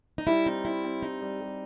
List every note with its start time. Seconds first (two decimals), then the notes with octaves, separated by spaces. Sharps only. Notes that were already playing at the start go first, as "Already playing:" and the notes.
0.18 D#4
0.27 G3 E4
0.46 C4 D#4
0.65 C4 E4
0.84 C4
1.03 G3 D#4
1.21 G3
1.41 G3